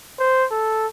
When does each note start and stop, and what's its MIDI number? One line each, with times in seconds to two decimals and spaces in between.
0.20 0.46 72
0.52 0.87 69